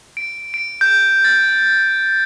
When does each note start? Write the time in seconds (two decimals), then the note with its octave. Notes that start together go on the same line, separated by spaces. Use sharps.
0.17 D7
0.54 D7
0.81 G6
1.24 A6